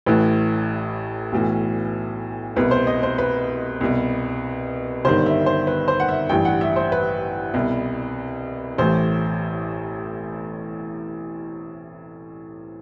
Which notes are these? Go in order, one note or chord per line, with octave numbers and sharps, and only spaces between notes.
A1 A2 E3 B4
B1 A2 E3
C2 B2 B4
C5
D#5
C5
B4
C2 B2
G1 G2 D#3 C5
E5
C5
B4
C5
F#5
E5
A1 G2 E3 G5
F#5
E5
C5
B4
C2 B2
A1 A2 E3 C5